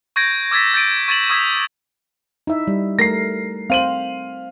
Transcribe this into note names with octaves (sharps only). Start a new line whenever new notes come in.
C#6 G6 G#6 A#6 D7
D6 E6 G#6 A6 B6
G6 A6 A#6 D7 D#7
C#6 G#6 A6 D#7 E7 F#7
C#6 D#6 E6 G#6 B6
D#4 E4 E5
G3
A3 A#4 A#6 C7
C4 C5 F5 D#7 F#7